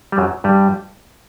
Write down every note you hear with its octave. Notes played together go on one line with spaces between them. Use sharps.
G3
F#2 F#3
G2 G3